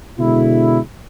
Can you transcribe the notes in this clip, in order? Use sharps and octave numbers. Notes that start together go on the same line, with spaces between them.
B2 D3 G#3 E4